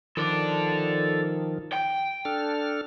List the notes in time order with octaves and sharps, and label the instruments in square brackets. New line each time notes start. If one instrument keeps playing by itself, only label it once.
[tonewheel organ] D#3 F3 [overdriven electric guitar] A4 D5
[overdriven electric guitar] G5
[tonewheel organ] D4 A4 F6